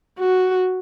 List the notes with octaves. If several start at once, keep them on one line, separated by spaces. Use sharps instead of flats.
F#4